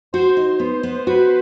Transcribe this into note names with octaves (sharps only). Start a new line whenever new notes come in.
F#4 C5
D#4
B3
B3
F#4 B4